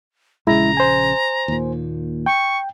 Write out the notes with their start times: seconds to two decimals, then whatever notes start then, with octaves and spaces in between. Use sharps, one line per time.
0.47 A#1 C#3 G#3 E4 A#5
0.77 C5 G#5
1.48 D#2 A#2
2.26 G5 C#6